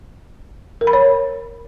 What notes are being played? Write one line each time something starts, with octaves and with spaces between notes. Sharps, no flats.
A#4
B5
C#5